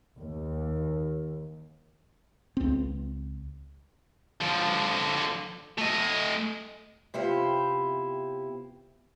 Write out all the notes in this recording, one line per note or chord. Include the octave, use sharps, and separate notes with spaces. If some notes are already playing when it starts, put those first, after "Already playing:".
D#2
C#2 C4
D3 F3
A3 D#5
C3 B3 E4 F4 G4